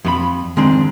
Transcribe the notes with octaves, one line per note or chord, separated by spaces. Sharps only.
F2 F4 B5
D#3 G#3 C4 D4